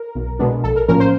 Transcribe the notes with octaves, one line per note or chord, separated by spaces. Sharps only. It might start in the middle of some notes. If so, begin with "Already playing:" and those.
Already playing: A#4
B1
B2 G#3 B3 D4
A#1 A4
A#4
A2 F3 A#3 C#4 A#4
C5